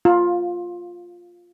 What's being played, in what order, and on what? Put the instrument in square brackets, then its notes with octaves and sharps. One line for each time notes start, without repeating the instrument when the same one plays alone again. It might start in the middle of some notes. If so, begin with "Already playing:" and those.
[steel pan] F4